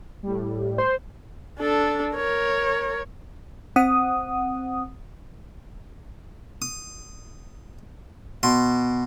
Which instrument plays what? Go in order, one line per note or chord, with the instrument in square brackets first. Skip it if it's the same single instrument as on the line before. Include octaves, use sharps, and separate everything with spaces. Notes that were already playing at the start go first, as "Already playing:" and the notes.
[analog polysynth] A2 G3
[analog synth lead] C5
[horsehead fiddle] D4 A4
A#4 C#5
[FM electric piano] C4 F#5 D#6
[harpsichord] D#6
B2 C6